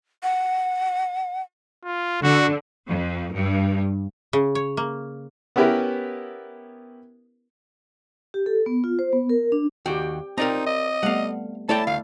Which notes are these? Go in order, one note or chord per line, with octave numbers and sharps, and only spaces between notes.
F#5
F4
D3 F#4
F2
G2
C#3
C#5
A#3
B3 C#4 E4 G4 A#4 B4
G4
A4
B3
F4
C5
B3
A#4
D4
D#2 F#4 G4 G5
C4 D#4 A#4 D5 A#5
D#5
G3 A3 B3 F5 F#5
A3 E4 A4 C#5 D5 G5 A5
D2 F5